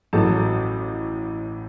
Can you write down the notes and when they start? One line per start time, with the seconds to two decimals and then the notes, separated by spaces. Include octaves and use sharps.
0.13 A1 A2 F#3 A4 A5